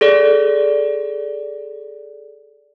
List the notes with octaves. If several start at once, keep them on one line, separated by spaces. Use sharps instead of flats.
G#4 A4 D5